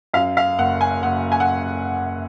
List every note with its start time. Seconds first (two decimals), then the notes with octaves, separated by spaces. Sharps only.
0.14 F#2 F5
0.37 F5
0.59 F#1 F#5
0.81 G#5
1.03 F#1 F#5
1.32 G#5
1.40 F#5